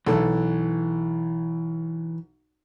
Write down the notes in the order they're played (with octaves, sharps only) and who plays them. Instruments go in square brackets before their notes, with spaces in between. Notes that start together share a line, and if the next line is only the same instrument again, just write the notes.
[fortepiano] B1 A4 [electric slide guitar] E3